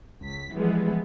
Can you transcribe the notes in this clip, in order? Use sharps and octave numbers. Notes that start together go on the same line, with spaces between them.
C#2 B6
E3 F3 G3 G#3 B3